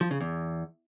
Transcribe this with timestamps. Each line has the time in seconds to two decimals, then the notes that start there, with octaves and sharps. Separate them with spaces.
0.01 F3
0.11 C#3
0.20 E2